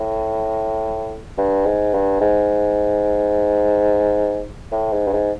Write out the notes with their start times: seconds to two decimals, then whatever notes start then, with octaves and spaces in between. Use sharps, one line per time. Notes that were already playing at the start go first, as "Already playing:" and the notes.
Already playing: A2
1.38 G2
1.66 G#2
1.94 G2
2.21 G#2
4.71 A2
4.92 G#2
5.07 G2
5.13 G#2